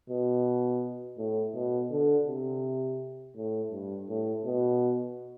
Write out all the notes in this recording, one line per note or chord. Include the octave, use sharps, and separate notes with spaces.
B2
A2
B2
D3
C3
A2
G2
A2
B2